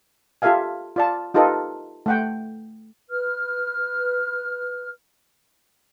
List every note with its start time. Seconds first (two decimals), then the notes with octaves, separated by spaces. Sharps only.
0.42 F4 G4 A4 E5 F5 G#5
0.96 F4 D5 A5
1.34 D#4 F4 G4 A4 B4 D#5
2.06 A3 F#5 G5
3.10 B4 F6